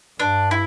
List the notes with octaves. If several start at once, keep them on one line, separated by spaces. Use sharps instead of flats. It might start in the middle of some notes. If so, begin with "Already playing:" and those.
G2 D4
E4